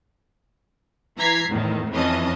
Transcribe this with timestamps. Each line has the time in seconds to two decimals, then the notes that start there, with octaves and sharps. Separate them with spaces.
1.18 E3 A#5 G#6 B6 C7
1.50 E2 A2 D#3
1.91 F2 E3 C4 C#4 D#5 A5